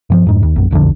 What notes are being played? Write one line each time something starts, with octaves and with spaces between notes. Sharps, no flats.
G2 E3 F3
F2 G#2
D#2
A#1 F#2
D#1 B1 F2 D3